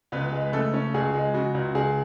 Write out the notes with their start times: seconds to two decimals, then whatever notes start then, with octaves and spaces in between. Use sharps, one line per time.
0.12 C#2 B3 B4
0.32 G#3
0.52 C#3 A3 A4
0.74 C#4
0.94 C#2 G#4
1.14 G#3
1.34 C#3 F#4
1.55 C#2
1.75 C#2 G#4